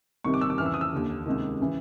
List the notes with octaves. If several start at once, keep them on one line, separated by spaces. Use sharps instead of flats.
C2 C3 D#3 C#6
D6
E6
D6
F2 C#3 E3 F6
E6
D#6
E6
D#2 D3
C#2 C3 D#3
C#3 E3